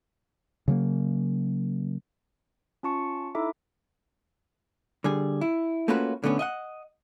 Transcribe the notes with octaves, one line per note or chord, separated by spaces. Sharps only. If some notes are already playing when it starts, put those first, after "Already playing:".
C#3 F#3 A#3
C#4 F4 A5 C#6 C#7
D#4 E4 A4 E5 D6
D3 G3 G#4
E4
A3 A#3 C#4 F4 F#4 B4
D3 A3 B3 C#4
D#5 E5 F#5